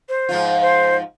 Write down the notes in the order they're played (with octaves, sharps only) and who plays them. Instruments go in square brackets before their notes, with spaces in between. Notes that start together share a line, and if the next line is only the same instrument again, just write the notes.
[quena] C5
[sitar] G#2 F3 F4
[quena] C5